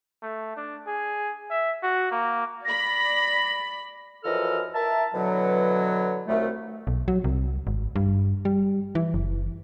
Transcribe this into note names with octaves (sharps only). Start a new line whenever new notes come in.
A3
D4
G#4
E5
F#4
A#3
D5 B5 A#6
F#2 E3 F3 A4 D#5 F6
A#4 E5 A5
B2 D3 E3 F#3
C2 D#3 F#3 A3
B1
F#3
C2
G#1
G2
G3
E3
F#1